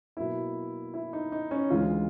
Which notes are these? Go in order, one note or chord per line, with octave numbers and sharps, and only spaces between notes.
B2 F#3 A#3 E4
E4
D#4
D#4
C#4
D2 C#3 E3 G#3 F4